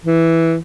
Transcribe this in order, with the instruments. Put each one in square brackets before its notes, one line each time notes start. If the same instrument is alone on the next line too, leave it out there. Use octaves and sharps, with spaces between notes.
[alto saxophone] E3